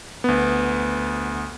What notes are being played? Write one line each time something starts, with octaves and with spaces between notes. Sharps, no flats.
D2 B3